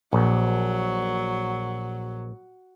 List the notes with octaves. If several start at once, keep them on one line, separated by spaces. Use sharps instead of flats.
A#1 F#3